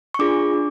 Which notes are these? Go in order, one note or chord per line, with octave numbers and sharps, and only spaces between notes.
C#6
D4 F4 G#4 D6
D4